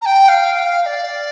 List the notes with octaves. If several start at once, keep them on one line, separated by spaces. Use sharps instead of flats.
A#5
G5
F5
G5
F5
F5
D5